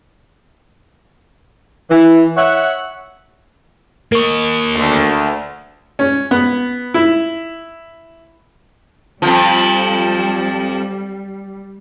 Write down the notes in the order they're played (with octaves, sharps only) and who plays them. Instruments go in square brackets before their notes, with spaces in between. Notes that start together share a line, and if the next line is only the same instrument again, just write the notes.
[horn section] E3
C#5 E5 F#5
[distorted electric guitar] A#3 D#5 [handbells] A#4 C#6
[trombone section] D2
[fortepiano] C#4
B3
E4
[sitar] F2 F3 [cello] G3